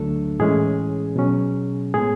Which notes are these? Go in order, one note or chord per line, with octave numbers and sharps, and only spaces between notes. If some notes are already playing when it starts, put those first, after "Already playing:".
Already playing: D2 D3 F#3 A3 D4 A4
A2 E3 G#3 C#4 G#4
B2 F#3 C#4
A2 G#3 B3 G#4